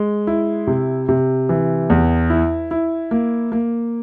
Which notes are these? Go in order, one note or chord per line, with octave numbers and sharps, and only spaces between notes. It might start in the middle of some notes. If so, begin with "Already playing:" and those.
Already playing: G#3
E4
C3
C3
E3
E2
E4
E4
A#3
A#3